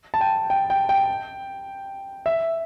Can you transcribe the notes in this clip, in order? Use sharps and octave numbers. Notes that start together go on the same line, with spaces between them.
A5
G5
G5
G5
G5
E5